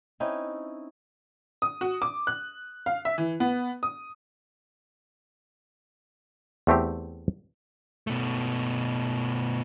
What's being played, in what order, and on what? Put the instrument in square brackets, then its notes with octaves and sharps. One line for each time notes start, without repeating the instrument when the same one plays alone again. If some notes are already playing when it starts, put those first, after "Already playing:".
[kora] C4 C#4 D#4 E4
[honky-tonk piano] D#6
F#4
D6
F#6
F5
E5
E3
B3
D#6
[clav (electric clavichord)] E2 A3 C4 G4
[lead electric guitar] B2 A3